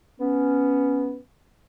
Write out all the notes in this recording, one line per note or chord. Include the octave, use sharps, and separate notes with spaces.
B3 C#4